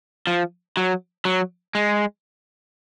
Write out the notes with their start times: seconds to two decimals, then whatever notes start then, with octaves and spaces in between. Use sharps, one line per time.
0.27 F3
0.77 F#3
1.25 F#3
1.75 G#3